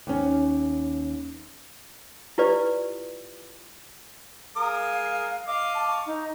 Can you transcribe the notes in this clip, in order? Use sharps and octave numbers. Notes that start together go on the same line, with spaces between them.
D#2 C#4
E4 F4 G4 B4 D5
G#3 A#4 F5 D#6
D#5 F5 D6
A5
C#6
D#4